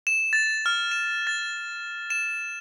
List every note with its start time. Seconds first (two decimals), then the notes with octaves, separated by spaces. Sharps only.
0.07 E7
0.33 A6
0.66 F6
0.92 E7
1.27 A6
2.10 E7